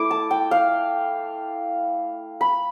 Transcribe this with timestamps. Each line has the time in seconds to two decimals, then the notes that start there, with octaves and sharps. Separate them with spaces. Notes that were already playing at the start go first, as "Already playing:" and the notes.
Already playing: A3 E4 D6
0.11 A5
0.31 G5
0.51 F5
2.41 B5